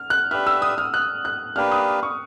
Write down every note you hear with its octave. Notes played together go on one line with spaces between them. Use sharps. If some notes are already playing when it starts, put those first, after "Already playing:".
Already playing: F6
F#6
D4 G4 B4 E5 F6
E6
D#6
F6
F#6
F#6
A#3 D4 G4 B4 F6
D#6
C#6